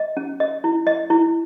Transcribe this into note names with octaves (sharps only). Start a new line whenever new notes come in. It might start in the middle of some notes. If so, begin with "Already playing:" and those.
Already playing: D#5
C#4
D#5
E4
D#5
E4